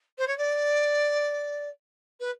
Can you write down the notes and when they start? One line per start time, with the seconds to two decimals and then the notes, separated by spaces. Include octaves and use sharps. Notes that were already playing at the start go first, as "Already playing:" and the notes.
0.18 C5
0.27 C#5
0.38 D5
2.20 B4